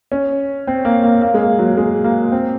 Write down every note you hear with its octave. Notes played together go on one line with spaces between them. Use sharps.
C#4
C4
A#3
A#3
A#3
G#3
A#3
F#3
G#3
A#3
C4